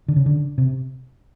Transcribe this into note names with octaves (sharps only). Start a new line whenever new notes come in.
D3
C#3
D3
C3